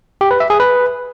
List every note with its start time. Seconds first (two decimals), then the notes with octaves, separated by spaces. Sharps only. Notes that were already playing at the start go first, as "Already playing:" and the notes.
0.21 G4
0.31 B4
0.40 E5
0.50 G#4
0.60 B4